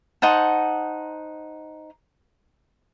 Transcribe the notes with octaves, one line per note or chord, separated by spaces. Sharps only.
D#4 C5 F#5 A5